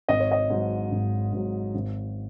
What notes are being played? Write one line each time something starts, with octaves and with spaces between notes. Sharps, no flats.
G#1 D#5
C#5
D#5
G#2 F#3
G#1
G#2 F#3
G#1